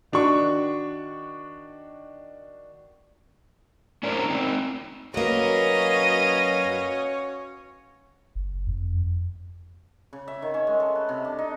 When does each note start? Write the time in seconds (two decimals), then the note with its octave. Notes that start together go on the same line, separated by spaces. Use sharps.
0.12 D#3 D4 F#4 C#6
4.03 C#4 D4 E4 A#4 C5 D5
4.30 C4 D#4
5.14 F#2 A#3 C#4 F#4 B4 C#5 D#5 F5
8.35 F#1
8.67 F2
10.13 C#3
10.28 E5
10.42 D#3
10.54 C#4
10.67 G#3
10.80 A4
10.95 B4
11.09 C3
11.25 D4
11.39 D#4